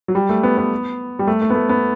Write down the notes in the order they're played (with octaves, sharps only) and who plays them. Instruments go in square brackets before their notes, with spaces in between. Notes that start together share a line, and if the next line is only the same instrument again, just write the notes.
[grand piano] F#3
G3
A3
B3
B3
G3
A3
A3
B3
A3
B3